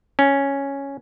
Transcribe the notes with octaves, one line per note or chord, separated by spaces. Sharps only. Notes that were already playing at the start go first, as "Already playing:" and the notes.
C#4